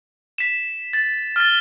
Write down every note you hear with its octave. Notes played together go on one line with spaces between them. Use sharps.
B6 E7
A6
F6 A6